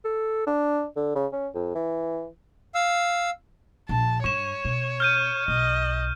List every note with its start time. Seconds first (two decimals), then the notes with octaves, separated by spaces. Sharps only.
0.04 A4
0.47 D4
0.96 D3
1.15 C#3
1.33 C#4
1.55 F2
1.75 E3
2.75 F5 E6
3.89 A#1 A5
4.24 G2 C#5 C#6 E7
4.65 B2
5.00 F6 G6 D#7
5.48 B1 D#5